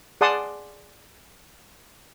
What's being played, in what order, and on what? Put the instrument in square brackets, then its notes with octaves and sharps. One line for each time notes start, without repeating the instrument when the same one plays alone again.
[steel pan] G#4 D5 F#5 A5 C6 D#6